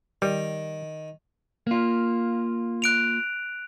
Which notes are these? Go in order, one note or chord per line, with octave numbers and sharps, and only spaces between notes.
D#3 G3
A#3 F4
F#6 D7 F7